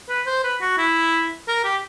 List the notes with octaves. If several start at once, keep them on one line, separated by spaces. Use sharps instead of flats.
B4
C5
B4
F#4
E4
A#4
G4